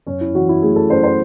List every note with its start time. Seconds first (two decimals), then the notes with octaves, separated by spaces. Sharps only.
0.06 F#2 C#4
0.21 E4
0.34 E3 F#4
0.49 E4
0.62 A3 G#4
0.76 A4
0.90 F#2 C5
1.03 C5